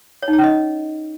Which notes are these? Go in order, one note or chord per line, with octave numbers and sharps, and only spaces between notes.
C#5
D#4
C#5
C#4
D#5